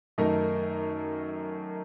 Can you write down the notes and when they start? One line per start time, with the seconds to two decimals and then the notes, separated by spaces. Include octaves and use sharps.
0.18 F#2 D#3 A3 D#4 A#4